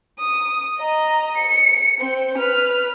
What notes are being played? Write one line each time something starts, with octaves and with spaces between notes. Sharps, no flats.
D#6
D#5 A#5
C#7
C4 C5
B4 F6